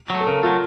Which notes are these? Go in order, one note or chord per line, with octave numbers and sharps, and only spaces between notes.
F#3 A3
A4
C#3 A#4
F#3 A3 F4